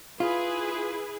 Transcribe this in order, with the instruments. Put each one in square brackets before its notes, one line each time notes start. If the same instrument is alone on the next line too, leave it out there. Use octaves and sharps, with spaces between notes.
[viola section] E4 G#4 B4 [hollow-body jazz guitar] F4